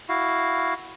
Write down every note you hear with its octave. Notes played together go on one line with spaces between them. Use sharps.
E4 F#4 F5